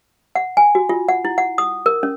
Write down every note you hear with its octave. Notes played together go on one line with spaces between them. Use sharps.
F#5
G#5
F#4
F4
F#5
E4
F#5
D#6
A#4
C#4